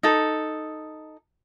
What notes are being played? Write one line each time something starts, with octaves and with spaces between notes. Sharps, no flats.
D#4 A4